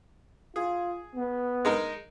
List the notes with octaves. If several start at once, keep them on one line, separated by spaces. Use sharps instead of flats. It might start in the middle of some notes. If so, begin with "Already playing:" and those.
F4 G#4
B3
G#3 D#4 A#4